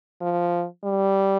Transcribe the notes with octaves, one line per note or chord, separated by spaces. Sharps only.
F3
G3